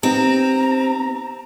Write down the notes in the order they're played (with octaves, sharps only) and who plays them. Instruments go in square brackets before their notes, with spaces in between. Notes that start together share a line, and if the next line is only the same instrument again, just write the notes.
[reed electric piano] B3 D#4 G4 [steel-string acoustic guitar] C4 [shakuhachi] A#5